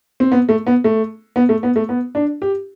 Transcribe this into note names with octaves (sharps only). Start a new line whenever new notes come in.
C4
B3
A3
B3
A3
B3
A3
B3
A3
B3
D4
G4